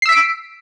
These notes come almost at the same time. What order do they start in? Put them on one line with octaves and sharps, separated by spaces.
C7 E6 B6 D7